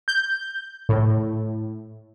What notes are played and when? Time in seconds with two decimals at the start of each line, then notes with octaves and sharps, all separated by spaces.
0.08 G6
0.89 A2